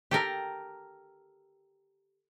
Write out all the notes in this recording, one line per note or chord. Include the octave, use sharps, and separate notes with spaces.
G4 A4 A#4